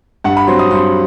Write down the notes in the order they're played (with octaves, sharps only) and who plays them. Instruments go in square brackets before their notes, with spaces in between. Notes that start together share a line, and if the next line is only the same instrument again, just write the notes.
[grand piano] G2 F#5
B5
F#3 C4 C6
D#6
G2 C6